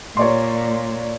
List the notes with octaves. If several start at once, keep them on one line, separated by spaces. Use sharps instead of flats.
A#2 C#5 D5 C6